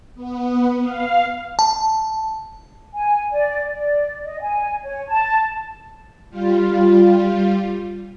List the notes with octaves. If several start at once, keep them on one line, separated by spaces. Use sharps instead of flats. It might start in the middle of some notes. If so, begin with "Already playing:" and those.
B3
F5
A5
G#5
D5
D5
D#5
G#5
C#5
A5
G3 F4